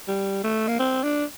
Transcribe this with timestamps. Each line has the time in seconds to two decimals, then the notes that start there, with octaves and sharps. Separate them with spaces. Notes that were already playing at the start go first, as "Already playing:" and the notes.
0.08 G3
0.44 A3
0.68 A#3
0.79 C4
1.03 D4